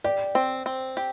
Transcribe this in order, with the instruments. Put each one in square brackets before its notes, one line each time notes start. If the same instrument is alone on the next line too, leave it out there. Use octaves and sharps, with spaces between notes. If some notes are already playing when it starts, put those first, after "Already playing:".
[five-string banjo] G4 [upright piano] D5
[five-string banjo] C4
C4
G4